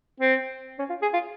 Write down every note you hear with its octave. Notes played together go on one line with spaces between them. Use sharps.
C4
C#4
F4
G#4
F4